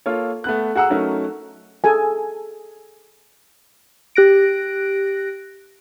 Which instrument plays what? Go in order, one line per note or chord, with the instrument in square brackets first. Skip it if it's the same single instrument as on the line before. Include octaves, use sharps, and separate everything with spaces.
[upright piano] A#3 F4 A4 C#5
A3 B3 F#6
F#4 G#4 F#5 A#5 E6
F#3 A3 C#4 D#4 F#4 A#4
[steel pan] G#4 A4 G#5
[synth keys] G4 F#6 A#6 D7